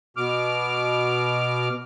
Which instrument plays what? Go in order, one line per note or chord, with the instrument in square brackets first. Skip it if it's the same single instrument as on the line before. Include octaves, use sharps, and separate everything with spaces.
[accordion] B2 D6 F6